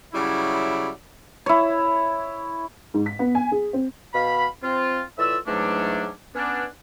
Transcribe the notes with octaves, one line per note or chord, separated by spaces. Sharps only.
C#3 F#3 G3 E4
E4 C#5
G#2
B6
B3
G#5
G#4
C4
B2 F5 B5
C4 F4
A2 E3 F4 D5 E5 E6
G#2 E3 F#3 A3 C#4 D4
B3 C#4 D4